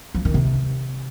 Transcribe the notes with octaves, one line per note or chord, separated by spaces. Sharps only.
F3
D#3
C3